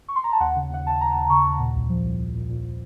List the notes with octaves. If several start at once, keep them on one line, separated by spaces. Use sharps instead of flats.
C#6
C6
A#5
A5
D#2 F#5
C#3
D#2 F#5
D#2 A5
D#2 A#5
D#2
C#3 C#6
D#2
A#2
C2
F3
C2
C2
A#2
A#2